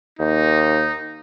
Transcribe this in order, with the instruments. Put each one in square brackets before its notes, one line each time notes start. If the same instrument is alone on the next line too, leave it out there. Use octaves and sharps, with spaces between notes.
[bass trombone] D#2 [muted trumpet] D#4